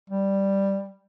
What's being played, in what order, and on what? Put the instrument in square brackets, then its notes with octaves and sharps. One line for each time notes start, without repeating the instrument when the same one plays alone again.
[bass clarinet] G3